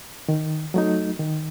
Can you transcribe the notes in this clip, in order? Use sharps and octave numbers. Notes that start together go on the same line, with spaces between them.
D#3
F#3 A3 D#4
D#3